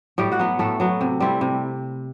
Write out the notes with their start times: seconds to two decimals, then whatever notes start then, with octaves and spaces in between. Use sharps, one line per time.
0.18 A2 G3 G4
0.32 F#4 F#5
0.39 F#3 B3
0.59 A2 A3 A4
0.80 F#3 B3
1.01 C3
1.20 G3 C4 E4
1.41 C3